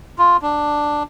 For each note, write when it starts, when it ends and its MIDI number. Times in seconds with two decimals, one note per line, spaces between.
0.19 0.37 65
0.42 1.03 62